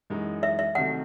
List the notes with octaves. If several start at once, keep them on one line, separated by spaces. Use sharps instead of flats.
F#2 E3 G#3 D#4 F#4
E5
E5
C2 C3 D#3 F#3 A3 F#5